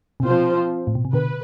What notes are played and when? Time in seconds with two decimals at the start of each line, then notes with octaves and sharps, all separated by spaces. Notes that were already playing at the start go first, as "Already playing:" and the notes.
0.20 C3
0.23 B2 F3 C4 F4 C5
0.87 A2
0.95 B2
1.05 C3
1.13 B2 D3 B4